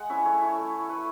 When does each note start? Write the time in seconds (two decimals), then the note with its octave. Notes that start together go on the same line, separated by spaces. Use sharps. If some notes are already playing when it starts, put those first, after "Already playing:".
Already playing: G#3 F#5
0.09 C#4 E4 E5
0.25 A3 C#5
0.42 E4
0.58 A3
0.73 E4
0.89 A3 B4